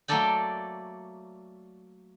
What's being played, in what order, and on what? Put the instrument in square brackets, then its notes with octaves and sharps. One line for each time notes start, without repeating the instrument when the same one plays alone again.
[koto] F#3 A3 A#3 A4 D5 G5